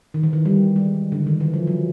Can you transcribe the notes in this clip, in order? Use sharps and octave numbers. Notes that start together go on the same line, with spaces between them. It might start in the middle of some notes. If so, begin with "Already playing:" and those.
D#3
E3
D#3
G3
G#3
D3
D#3
E3
F3
F#3